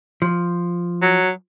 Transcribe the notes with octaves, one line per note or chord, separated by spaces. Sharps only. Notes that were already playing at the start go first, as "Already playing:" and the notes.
F3
F#3